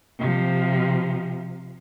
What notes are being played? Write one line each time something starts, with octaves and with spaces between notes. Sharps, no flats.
C3 F3